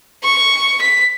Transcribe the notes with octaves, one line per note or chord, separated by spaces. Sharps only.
C#6
B6